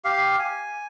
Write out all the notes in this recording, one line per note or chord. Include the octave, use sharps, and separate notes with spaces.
G4 F5
G#5